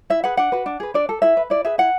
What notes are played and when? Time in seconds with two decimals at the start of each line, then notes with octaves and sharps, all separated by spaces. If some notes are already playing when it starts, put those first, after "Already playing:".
0.10 E4 E5
0.24 G#4 B4 F#5
0.37 D4 F#5
0.52 F#4 B4
0.66 D4
0.80 G#4 B4
0.94 D4 D5
1.09 A4
1.22 E4 E5
1.37 B4
1.50 E4 D5
1.65 G#4 B4 E5
1.78 E4 F#5